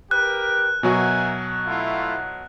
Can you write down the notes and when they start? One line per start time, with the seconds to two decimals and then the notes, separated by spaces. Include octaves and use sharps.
0.11 G4 A#4 B4 F#6
0.83 B2 F#3 F#4 A#4 E5 G#5
1.67 A3 E4 F4